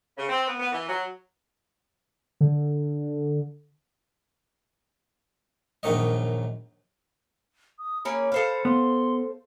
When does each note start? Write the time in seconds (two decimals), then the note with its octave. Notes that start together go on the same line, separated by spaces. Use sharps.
0.17 C#3
0.29 C4
0.47 B3
0.59 B3
0.72 E3
0.88 F#3
2.41 D3
5.83 A#1 F#2 D#3 C#5 D#5
7.79 D#6
8.05 A#3 C#4 G#4 B5
8.32 A4 C5 F5
8.65 B3 C6